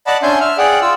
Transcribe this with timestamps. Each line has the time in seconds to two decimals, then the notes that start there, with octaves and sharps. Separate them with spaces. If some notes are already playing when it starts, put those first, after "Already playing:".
0.07 D5 D#5 F#5 A5 B5
0.23 C#4 D4 E5 G#5 C6 G6
0.40 E5 F6
0.58 G#4 D5 F#5 G5
0.81 F4 E6